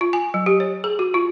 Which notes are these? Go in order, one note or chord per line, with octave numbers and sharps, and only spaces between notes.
F4
G#5
F#3
G4
C#5
G#4
F#4
F4